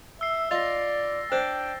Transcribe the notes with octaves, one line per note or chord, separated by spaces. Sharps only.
E5 E6 C7
F4 D5 D#5 A6 A#6
D4 C5 G5